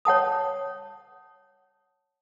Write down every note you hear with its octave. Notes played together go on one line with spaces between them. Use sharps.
C#5 F#5 A5 D#6